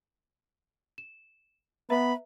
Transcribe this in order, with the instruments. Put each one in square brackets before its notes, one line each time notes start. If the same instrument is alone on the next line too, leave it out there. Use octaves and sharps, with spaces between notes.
[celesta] E7
[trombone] B3 [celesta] B4 E5 A#5 [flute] B5